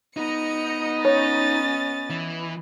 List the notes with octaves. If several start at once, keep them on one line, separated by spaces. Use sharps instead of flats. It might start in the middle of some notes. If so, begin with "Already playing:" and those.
B3 D#4 D#5 C#7
C#4 C#5 A6
E3